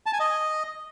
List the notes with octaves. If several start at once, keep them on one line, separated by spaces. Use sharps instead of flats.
A5
G#5
D#5